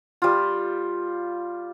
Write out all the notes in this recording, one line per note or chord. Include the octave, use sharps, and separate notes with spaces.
G3 F4